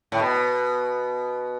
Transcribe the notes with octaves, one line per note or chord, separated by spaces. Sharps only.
A2
B2